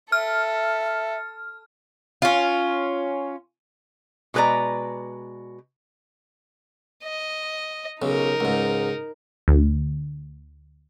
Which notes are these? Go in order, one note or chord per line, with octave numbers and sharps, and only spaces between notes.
A4 E5 F6
C#4 F4
B2 G#3 B4 D5 A#5
D#5
B1 C#3 D#4 A#4
C#2 G#2
D2